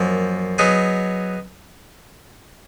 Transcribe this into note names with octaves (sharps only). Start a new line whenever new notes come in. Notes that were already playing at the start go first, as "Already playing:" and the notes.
Already playing: F#2 F3 A#3
F#3 B3 D#4 G#4